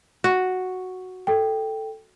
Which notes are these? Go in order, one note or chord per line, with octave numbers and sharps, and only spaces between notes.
F#4
A4 G5